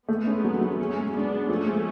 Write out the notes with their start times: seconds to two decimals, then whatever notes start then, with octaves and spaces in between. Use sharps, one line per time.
0.09 G#3 A3 B3
0.27 C#4
0.44 F#3
0.61 F#3
0.79 A3 C#4 G#4
0.97 G#3
1.14 G#3 B3 D4
1.32 G#4
1.49 F3 A3 C#4
1.66 G#3